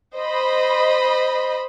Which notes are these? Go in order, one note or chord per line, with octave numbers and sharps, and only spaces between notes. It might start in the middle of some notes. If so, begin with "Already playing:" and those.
C5 D#5 B5